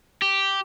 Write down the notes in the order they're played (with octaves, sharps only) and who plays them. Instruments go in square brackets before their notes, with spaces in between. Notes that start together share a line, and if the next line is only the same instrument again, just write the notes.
[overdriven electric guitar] G4